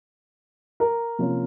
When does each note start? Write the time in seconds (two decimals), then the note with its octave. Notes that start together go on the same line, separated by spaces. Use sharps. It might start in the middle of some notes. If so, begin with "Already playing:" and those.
0.80 A#4
1.19 C3 F3 A#3 C#4 F4